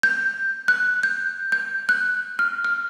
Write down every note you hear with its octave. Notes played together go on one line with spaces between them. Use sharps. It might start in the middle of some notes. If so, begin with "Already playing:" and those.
G6
F#6
G6
G6
F#6
F6
F6